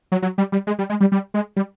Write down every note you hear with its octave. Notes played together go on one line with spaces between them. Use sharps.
F#3
F#3
G3
G3
G#3
G3
G#3
G3
G3
G#3
G3